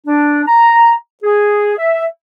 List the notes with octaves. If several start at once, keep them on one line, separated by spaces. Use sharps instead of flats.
D4
A#5
G#4
E5